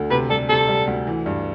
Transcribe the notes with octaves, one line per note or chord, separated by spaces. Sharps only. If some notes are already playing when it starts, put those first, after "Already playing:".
Already playing: D2 D3
C3 B4
G3 A4
C3 A4
G3
D2
E3
G2